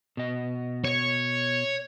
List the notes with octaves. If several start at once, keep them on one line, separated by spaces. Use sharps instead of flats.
B2 D#5
C#5